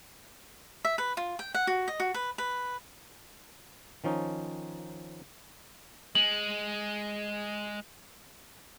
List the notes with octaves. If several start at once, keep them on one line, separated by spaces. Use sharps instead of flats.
E5
B4
F4
G5
F#5
F#4
D#5
F#4
B4
B4
D#3 F3 C#4 D#4
G#3 F#7